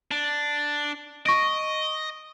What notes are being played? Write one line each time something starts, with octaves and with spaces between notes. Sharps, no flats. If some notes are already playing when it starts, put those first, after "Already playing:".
D4
D#5 C#6 A#6 D7